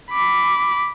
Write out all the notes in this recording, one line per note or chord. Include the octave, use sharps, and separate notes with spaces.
B5 D6